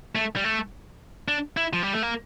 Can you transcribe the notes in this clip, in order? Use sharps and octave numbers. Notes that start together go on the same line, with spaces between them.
A3
G3
A3
D4
E4
F3
G3
A3
A#3